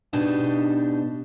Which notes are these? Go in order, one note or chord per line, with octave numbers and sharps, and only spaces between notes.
B2 D4 D#4 G4 A5